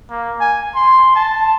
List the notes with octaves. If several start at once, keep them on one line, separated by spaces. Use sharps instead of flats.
A#3
G#5
C6
A5